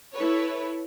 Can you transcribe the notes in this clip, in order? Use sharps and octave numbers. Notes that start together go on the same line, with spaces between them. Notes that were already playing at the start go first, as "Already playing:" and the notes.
E4 A4 B4 C#5